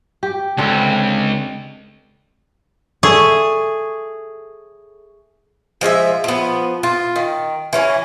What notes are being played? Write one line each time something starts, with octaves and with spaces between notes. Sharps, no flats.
G4
C#2 D3 C4 D4
G#4 A4 E5 C#6
F3 G#3 C5 E5
F3 B3
F4
D#3
E3 C#4 F#4